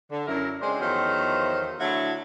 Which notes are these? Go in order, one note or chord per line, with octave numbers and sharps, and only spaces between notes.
D3
F#2 E4 A#4
C#3 G#3 C4 D4 C5
E2 D#3 F3 F#3 A3 C5
D3 F#3 A3 E4